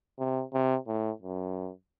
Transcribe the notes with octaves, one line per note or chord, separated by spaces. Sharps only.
C3
C3
A2
F#2